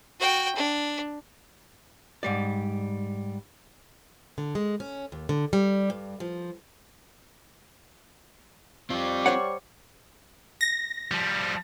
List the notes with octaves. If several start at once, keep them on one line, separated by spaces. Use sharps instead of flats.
F#4 G5
D4
G#2 G3 D5
D3
G#3
C#4
D#2
D3
G3
G2
F3
G3 C4 F4 D5 C#6
C5 C#5 F#5
A#6
F3 G3